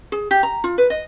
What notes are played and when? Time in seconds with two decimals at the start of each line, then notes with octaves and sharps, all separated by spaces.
0.12 G#4
0.31 G4
0.43 A#5
0.64 F4
0.78 B4
0.90 D#5